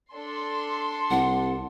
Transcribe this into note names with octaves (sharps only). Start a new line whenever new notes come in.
D4 A4 C6
C2 F#5